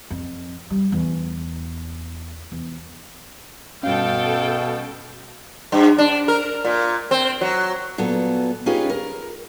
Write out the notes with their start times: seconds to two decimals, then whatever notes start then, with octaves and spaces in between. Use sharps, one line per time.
0.11 F2
0.70 G3
0.92 E2
2.52 E2
3.83 G2 B2 C#4 A4 F5 G5
5.72 G2
5.98 D4
6.28 A#4
6.65 A#2
7.11 C4
7.41 F#3
7.98 A#2 F#3 B3 A4
8.66 C#4 D#4 F4 G4 G#4 B4
8.90 A#4